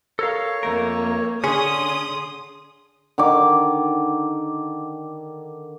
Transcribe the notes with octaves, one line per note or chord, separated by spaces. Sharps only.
A4 A#4 C#5 F5
F2 A3 A#3 A#4
D3 C#4 G#4 C6 D#6
D3 D#3 D6